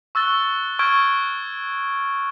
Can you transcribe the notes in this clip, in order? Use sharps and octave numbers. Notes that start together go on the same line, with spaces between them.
C#6 E6 F#6 A6 G7
C#6 E6 F6 G6 G#6 D7